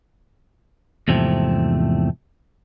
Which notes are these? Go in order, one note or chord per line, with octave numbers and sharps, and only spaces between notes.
E2 G#2 C3 F3 A3 C4